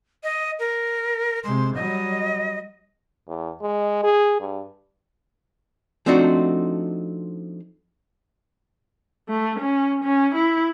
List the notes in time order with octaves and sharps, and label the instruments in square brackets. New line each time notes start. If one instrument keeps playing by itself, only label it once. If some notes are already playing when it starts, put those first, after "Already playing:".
[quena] D#5
A#4
[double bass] C3 G#3 [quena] C6
[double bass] F#3 G3 [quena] D#5
[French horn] E2
G#3
G#4
G2
[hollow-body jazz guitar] F3 A3 C4 D4 D#4 F#4
[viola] A3
C#4
C#4
E4